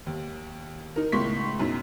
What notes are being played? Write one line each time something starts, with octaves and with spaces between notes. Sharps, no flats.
D#2
D#4 A#4
C#2 A2 C6 C#6 B6
F#2 B2 D#4